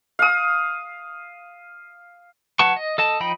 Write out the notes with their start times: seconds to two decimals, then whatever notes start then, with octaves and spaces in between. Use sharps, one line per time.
0.19 F5 D#6
2.59 F#3 B4 F#5 A5 C#6
2.76 D#5
2.98 A4 D#5 A5
3.20 F3 D#4 D#5 G5 B5